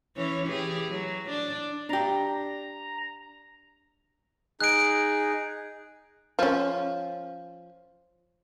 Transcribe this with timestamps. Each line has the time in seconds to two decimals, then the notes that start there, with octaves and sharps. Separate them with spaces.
0.16 E3 C#4 C#5
0.47 E3 G4 G#4
0.90 F#3
1.30 D4
1.89 D4 G4 A#5
4.61 D#4 G#4 F#6 D7
6.39 F3 C#4